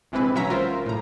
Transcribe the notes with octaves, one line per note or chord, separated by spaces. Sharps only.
A#1 C3 E3 G#3 C4 B4
B1 F#3 C#4 E5 A#5 B6
F4 A#4 C5
A2 A#5